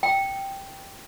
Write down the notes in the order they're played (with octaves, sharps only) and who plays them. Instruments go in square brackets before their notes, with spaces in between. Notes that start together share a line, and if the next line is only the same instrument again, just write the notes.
[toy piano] G5